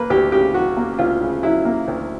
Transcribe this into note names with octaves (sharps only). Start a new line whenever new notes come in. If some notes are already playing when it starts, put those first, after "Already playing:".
Already playing: A#3 B4
D2 G4
C#3 G4
F#3 F#4
A#3
D2 F4
C#3
F#3 E4
A#3
D2